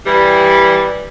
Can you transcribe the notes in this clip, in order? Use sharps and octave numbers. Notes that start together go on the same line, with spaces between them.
E3 G3